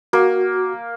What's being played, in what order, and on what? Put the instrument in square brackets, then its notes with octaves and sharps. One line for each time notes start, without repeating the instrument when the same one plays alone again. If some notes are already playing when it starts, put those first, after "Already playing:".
[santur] A#3 [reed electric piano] F#4